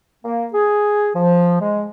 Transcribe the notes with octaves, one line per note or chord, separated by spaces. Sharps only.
A#3
G#4
F3
G#3